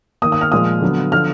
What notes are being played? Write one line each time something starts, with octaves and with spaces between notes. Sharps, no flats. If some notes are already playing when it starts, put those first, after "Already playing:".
D#3 A#3 D#6
D#6
F6
A#2 F3 G#3 D#6
D3 F#3 B3
D3 F3 B3 F6